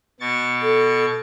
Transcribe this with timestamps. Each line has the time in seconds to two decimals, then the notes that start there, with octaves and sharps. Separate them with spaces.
0.20 B2 C#6 A6
0.62 A4